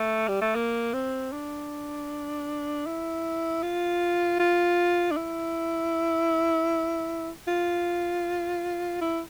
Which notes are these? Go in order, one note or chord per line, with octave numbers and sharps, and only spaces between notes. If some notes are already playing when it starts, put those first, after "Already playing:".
Already playing: A3
G3
A3
A#3
C4
D4
E4
F4
F4
D4
E4
F4
E4